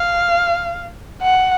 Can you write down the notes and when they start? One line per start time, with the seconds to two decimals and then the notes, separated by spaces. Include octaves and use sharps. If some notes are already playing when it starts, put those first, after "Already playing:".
Already playing: F5
1.22 F#5